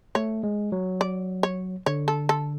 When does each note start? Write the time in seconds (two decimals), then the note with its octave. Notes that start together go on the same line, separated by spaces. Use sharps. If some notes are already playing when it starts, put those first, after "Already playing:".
0.15 A3 C#5
0.43 G#3
0.72 F#3
1.01 D5
1.43 C#5
1.86 D3 C#5
2.08 A4
2.29 A4